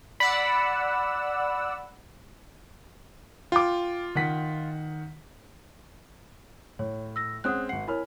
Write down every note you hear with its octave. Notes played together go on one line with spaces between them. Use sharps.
D5 F#5 B5 E6
F4 G5 D6
D#3 F#5 B6
A2 C#5
E6 A#6
G#3 C4 C#4 F#5 D#6 F#6
G#1 F#5 C7
E4 A#4 C#5 G#5 B5 F6